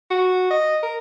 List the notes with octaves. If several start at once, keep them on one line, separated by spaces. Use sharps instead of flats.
F#4
D#5
A#4